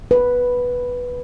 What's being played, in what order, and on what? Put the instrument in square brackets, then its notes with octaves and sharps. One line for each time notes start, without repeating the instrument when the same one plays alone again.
[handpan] B4